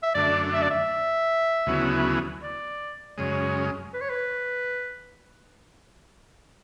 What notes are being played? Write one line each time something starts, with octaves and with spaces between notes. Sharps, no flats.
E5
F#2 D3 A3 D4 D5
E5
D5
E5
D2 C#3 F#3 B3 E4
D5
F#2 C#3 G#3 C#5
B4
C#5
B4